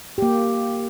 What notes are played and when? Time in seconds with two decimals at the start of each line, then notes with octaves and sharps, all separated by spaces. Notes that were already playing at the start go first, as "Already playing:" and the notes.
0.18 A#3 G4